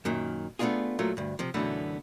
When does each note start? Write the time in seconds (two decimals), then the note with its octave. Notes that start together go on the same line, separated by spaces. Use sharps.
0.05 F#2 A#2 D#3
0.59 A3 B3 C4 D4 F4 G#4
0.99 A#2 F#3 A3 F4 A#4
1.17 D2 G2
1.39 C3 F3
1.54 F#2 B2 D3 E3 A3 B3